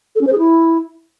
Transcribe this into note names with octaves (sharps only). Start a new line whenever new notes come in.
A4
C#4
C5
G#4
E4